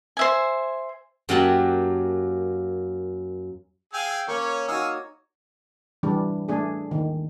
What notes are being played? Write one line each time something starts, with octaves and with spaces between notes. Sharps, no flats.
C5 E5 G#5
F#2 F#3 A#3 G4 F#5 A5
G#4 F5 G5 G#5 E6
A#3 C#4 C#5 C#6
D#4 F#4 F5 G#5 D#6 E6
E3 G3 D4
A3 D4 G#4
D#3